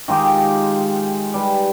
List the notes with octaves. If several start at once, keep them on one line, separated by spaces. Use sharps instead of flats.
D#3 G#3 F4 G4
G3 B4